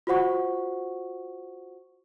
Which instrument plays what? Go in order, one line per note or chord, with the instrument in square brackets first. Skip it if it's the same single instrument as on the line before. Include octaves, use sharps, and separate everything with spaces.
[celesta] F4 F#4 C5 F#5 C#6